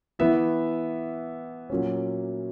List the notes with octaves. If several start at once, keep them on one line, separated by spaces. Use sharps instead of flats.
E3 B3 E4 E5
A#2 F#3 A#3 C#4